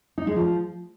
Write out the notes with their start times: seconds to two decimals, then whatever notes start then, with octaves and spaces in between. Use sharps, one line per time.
0.18 D#4
0.27 G#3
0.36 F3